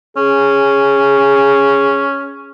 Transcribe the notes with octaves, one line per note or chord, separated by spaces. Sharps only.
C#4 G#4